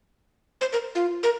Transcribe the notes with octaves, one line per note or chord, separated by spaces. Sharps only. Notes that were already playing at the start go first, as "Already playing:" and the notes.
C5
A#4
F4
A#4